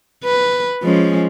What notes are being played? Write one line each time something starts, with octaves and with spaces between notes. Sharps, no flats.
B4
F3 G#3 C#4